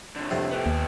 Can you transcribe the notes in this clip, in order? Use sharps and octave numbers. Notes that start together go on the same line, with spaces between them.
A#2 D3
F2 A2 C3
B3 G4
D#2